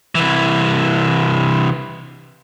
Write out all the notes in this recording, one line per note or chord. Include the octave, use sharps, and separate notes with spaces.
C2 E3